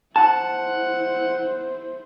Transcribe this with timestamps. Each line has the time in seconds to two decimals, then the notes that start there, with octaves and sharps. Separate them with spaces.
0.16 E4 C5 F#5 A5